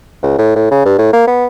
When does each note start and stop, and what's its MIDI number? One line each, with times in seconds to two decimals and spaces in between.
0.23 0.33 37
0.39 0.55 45
0.56 0.66 45
0.71 0.84 49
0.85 0.98 43
0.98 1.12 45
1.13 1.23 58
1.27 1.47 59